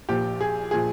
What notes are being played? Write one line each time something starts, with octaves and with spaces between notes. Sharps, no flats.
A#1 A#2 F3 G4
G#4
A#2 F3 G#4